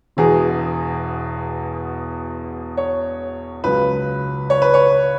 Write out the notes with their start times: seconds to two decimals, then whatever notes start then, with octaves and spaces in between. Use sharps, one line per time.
0.17 E1 E2 B2 G#4
2.77 C#5
3.64 C#2 C#3 F#3 B4
4.50 C#5
4.62 B4
4.74 C#5